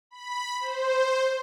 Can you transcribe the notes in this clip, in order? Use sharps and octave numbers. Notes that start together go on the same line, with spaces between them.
B5
C5